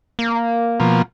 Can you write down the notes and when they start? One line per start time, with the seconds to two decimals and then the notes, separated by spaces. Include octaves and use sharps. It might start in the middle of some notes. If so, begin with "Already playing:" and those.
0.19 A#3
0.80 B2 F3 A#3